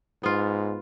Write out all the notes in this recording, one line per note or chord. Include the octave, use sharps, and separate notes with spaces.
G#2 B3 F4